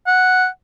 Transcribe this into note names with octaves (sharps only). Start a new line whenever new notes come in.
F#5